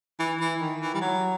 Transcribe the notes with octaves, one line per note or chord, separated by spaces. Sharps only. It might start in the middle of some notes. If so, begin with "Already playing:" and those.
E3
E3
D#3
E3
G3
F#3